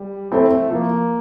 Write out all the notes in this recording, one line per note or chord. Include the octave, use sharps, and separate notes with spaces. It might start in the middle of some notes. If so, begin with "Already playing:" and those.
Already playing: G3
A3 C4 E4 A4 C5
F3 A#3